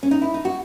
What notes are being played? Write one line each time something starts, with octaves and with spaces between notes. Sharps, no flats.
C#4
D#4
E4
D#4
F#4